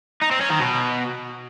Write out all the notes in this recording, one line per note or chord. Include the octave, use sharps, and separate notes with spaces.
D#4
C4
C#4
D#3
B2